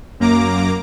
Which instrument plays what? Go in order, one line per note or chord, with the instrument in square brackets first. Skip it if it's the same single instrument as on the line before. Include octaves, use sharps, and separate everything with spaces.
[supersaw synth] F#2 A#3 A#5 D6